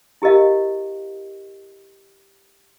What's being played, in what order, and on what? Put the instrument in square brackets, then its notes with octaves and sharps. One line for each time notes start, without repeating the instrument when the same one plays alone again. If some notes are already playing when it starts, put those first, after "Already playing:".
[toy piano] E4 G4 A#4 D#5 F5